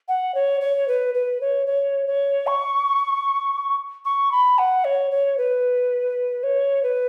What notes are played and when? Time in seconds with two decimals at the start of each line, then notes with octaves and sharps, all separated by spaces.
0.08 F#5
0.35 C#5
0.61 C#5
0.88 B4
1.14 B4
1.41 C#5
1.67 C#5
2.07 C#5
2.47 C#6
4.05 C#6
4.32 B5
4.58 F#5
4.85 C#5
5.11 C#5
5.38 B4
6.43 C#5
6.83 B4